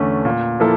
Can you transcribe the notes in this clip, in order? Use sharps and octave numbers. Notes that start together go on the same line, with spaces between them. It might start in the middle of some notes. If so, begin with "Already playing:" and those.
Already playing: E2 D3 A3 C#4
A#2
F3 A#3 E4 A4